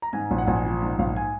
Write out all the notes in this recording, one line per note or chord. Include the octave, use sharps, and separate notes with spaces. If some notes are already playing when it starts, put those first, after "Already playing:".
A#5
G#2 G#5
A#1
F#5
A#1 G#5
F3
G#2
A#1 F5
G#5